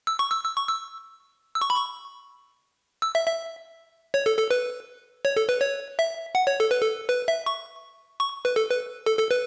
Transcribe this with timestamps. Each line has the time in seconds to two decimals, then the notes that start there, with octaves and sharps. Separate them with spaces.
0.07 E6
0.19 C#6
0.31 E6
0.44 E6
0.56 C#6
0.68 E6
1.55 E6
1.61 C#6
1.70 B5
1.76 C#6
3.02 E6
3.15 E5
3.27 E5
4.14 C#5
4.26 A4
4.38 A4
4.51 B4
5.25 C#5
5.37 A4
5.49 B4
5.61 C#5
5.99 E5
6.35 F#5
6.47 C#5
6.60 A4
6.71 B4
6.81 A4
7.09 B4
7.28 E5
7.46 C#6
8.20 C#6
8.45 B4
8.56 A4
8.70 B4
9.06 A4
9.19 A4
9.31 B4